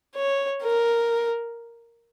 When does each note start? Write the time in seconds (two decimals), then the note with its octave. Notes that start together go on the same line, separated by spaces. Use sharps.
0.15 C#5
0.63 A#4